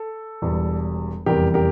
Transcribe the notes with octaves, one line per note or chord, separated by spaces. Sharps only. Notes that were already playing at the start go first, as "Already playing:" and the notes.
Already playing: A4
E1 E2 E3 G3
F1 E2 E3 G3 G4 A#4
G4 A#4